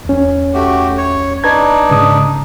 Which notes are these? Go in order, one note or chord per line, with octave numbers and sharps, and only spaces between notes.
E2 C#4
A3 F#4 G4
C#5
D4 D#4 B4 A#5 G#6
G#2 C#3 D#6